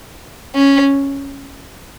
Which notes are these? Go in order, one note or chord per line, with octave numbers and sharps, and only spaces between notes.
C#4